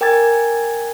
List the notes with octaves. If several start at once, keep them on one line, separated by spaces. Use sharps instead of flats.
A#4 G5 G#5 D6 G#6 A6